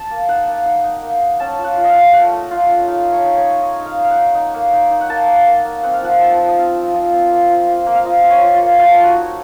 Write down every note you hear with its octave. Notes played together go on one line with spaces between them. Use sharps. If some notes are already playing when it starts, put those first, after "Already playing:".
Already playing: A5
A#3
D#4 F#5
A#3
D#4 F#5
D#4
A#3
D#4
C#4 A5
F4
F#5
F4
D#5
F5
F4
A3 F#5
A3
F4
C#4
D#4 F5
A3
C#5
D#4
C#5
D#4
D#4 D#5
D#4
F5
D#4
F5
F#5
D#4
D#4
A#3
D#4
D#4
F#5
A#3 A5
A#3
A#3
A#3
C4 F#5
F5
F3 F#5
C4 A5
F3
D#5
C4 F5
F3
F3 D#5
C4
A#3
F4
F4
A#3
F5
F4 D#5
F4
C#5
F4
F4
A#3
A3 F4
D#4
F#4
D#4